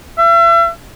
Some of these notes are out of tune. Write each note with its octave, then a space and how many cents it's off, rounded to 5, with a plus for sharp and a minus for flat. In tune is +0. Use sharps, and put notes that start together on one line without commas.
E5 +40